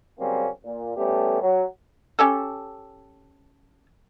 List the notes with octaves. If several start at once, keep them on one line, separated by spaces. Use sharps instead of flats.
C#3 F#3 G3 A#3 C4 C#4
A#2
G3 A3 B3 C#4 G4 A4
F#3
C#4 G4 A4